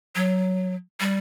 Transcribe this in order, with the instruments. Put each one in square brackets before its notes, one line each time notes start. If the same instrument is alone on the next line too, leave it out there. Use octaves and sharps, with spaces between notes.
[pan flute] F#3
G3